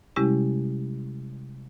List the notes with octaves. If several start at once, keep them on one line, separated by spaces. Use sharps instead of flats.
C3 G3 G#3 C#4 E4 G4